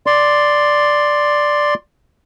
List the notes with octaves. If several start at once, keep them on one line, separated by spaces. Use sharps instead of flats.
D5 C6